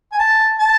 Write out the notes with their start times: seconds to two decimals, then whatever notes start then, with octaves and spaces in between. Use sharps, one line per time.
0.12 G#5
0.19 A5
0.59 A5